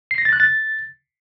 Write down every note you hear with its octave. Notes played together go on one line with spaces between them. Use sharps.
C7
A#6
A6
F#6
A6